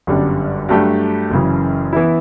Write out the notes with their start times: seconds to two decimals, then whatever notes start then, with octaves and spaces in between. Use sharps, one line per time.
0.07 G1 F#2 D3 G3
0.69 G2 F#3 A3 D4 G4
1.31 F#1 F#2 C#3 E3
1.93 E3 B3 E4